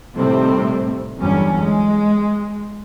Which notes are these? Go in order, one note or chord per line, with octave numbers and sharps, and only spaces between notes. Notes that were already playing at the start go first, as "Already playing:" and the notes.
A2 C3 D#3 G3 A3 C4
G1 E2 D3 F#3 G3 C#4
G#3